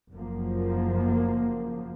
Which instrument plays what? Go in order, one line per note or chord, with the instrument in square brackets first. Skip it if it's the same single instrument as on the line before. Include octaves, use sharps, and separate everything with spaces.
[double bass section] F#1 F#2 F3 A#3